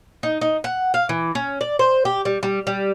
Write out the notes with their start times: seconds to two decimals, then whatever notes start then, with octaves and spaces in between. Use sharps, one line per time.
0.23 D#4
0.41 D#4
0.64 F#5
0.94 F5
1.09 E3
1.35 C#4
1.61 D5
1.79 C5
2.05 G4
2.25 G3
2.43 G3
2.67 G3